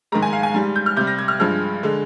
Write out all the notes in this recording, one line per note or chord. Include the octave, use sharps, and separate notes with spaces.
G#2 D#3 G#3 A#5
G#5
F5
G#5
G#2 G3
G6
F6
C3 G3 G6
A#6
G#6
F6
G2 F3 G#3 F6
D3 G#3